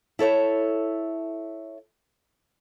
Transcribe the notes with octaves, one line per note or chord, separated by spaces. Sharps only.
E4 A4 C#5 E5